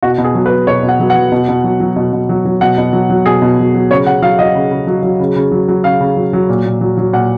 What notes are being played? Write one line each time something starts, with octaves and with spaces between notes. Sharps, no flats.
B2 F#4
B2
G#4
F#3
B4
F#3
B2 C#5
B2
F#5
F#3
F#5
F#3
B2
B2
F#3
F#3
B2
B2
F#3
F#3
B2 F#5
B2
F#3
F#3
B2 G#4
B2
F#3
F#3
C#3 C#5
C#3 F#5
F#3 F5
F#3 D#5
C#3
C#3
F#3
F#3
C#3
C#3
F#3
F#3
C#3 F5
C#3
F#3
F#3
A#2
A#2
F#3
F#3
A#2 F#5